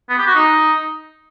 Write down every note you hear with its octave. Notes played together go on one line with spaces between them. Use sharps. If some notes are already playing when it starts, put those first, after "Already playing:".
B3
G4
F#4
D#4